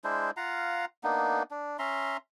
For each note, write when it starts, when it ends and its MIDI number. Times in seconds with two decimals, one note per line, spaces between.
0.04 0.31 56
0.04 0.31 62
0.04 0.31 64
0.04 0.31 72
0.37 0.85 65
0.37 0.85 77
0.37 0.85 78
0.37 0.85 82
1.04 1.43 58
1.04 1.43 59
1.04 1.43 62
1.04 1.43 63
1.51 1.77 62
1.79 2.17 61
1.79 2.17 76
1.79 2.17 82
1.79 2.17 84